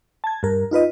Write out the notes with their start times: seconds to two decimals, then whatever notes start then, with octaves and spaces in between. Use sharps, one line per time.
0.24 A5 G#6
0.43 G2 A#4
0.71 D#4 F4 B4 D#5